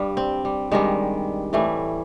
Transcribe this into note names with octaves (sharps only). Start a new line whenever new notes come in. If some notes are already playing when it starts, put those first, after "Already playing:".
Already playing: G2 G3
C4
G3
G2 D#3 G3 G#3
A2 E3 G3 A3